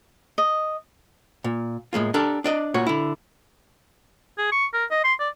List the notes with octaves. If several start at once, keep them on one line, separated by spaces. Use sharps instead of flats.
D#5
A#2
A2 G#3 A#3 F4
D4 G4 A4 A#4
D4 D5 D#5
A#2 F#4 C#5
D3 E4
G#4
C#6
A#4
D#5
C6
D5